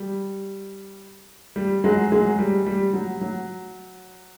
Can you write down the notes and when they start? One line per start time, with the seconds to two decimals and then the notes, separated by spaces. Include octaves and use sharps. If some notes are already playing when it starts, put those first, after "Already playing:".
Already playing: G3
1.56 G3
1.84 F#3 G#3
2.12 F#3 G#3
2.38 G3
2.66 G3
2.93 F#3
3.21 F#3